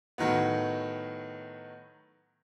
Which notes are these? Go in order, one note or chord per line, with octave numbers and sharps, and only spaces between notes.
A2 D#3 F#3 B3